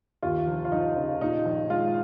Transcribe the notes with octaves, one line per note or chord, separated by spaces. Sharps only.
D#2 F4
F1
F4
F3 D#4
C#3
A#2 D#4
A#1
G#3 F4